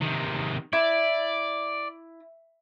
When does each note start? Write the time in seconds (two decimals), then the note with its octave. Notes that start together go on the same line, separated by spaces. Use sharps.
0.01 C3 D#3
0.73 E4 D5